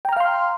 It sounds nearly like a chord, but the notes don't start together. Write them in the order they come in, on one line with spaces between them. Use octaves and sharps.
G5 A#5 F6 F5 C6